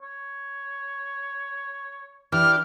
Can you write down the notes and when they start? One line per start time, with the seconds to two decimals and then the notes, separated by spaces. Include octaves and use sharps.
0.02 C#5
2.32 E3 D4 G4 F6